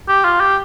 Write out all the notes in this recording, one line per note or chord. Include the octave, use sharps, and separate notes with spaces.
G4
F4
G4